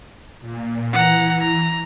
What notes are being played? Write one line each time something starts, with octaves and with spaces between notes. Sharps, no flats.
A#2
E3 F#5 A#5
A#5